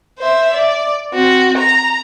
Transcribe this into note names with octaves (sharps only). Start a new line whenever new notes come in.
C5 E5
D5
C4 F#4
A#5